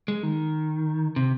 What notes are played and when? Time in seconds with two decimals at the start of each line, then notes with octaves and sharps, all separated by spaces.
0.08 G#3
0.23 D#3
1.16 C3